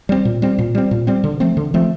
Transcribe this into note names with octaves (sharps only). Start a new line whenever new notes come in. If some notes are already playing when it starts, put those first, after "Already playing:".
G3 C4
A#2
G3 C4
A#2
G3 C4
A#2
G3 C4
D3
F3 A3 C4
D3
F3 A3 C4